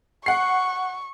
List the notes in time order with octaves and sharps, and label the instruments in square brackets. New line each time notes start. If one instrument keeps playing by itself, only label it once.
[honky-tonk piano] F#5 C7 [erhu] C#6